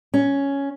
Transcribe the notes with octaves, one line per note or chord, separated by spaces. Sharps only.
C#4